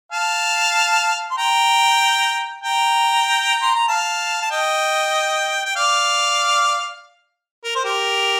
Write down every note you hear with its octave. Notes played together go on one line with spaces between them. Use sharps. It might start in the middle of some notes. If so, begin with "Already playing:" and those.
F5 A5
C6
G5 A#5
G5 A#5
C6
A#5
F5 A5
A5
D#5 G5
G5
D5 F5
A#4
C5
G4 A#4